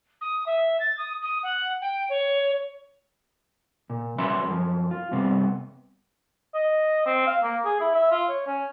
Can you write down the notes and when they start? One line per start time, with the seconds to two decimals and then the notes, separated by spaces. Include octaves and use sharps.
0.21 D#6
0.46 E5
0.79 A6
0.97 D#6
1.22 D#6
1.43 F#5
1.81 G5
2.09 C#5
3.90 A#2
4.18 F#3 C#4 B4 E5 B5 C6
4.47 F#2 F3
4.91 F4
5.11 G2 C3 G3 B3 C4
6.54 D#5
7.06 C4
7.27 F5
7.43 A#3
7.65 G#4
7.81 E4
7.95 E5
8.11 F4
8.29 C#5
8.47 C#4